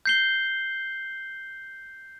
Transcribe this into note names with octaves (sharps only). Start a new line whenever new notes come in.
G6 C7 G7